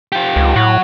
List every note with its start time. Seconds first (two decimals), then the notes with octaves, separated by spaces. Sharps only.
0.12 F4 G4
0.36 C#2
0.56 A2 F#3 F#4